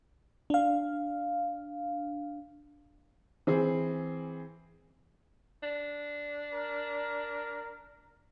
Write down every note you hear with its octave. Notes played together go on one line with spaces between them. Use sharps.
D4 F5
E3 C4 G#4
D4
A#4